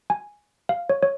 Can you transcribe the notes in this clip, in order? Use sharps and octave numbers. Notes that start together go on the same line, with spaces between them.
G#5
F5
C#5
C#5